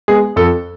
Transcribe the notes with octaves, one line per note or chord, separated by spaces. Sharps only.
G#3 B3 G#4
F2 A4